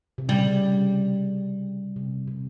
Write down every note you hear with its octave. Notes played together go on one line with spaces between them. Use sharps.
C3
C#3 G3
C3
C3